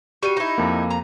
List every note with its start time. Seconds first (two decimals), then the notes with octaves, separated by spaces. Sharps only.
0.23 G3 F#4 C#6 D#7
0.37 D#4 E4
0.58 F2 A#3
0.90 A#5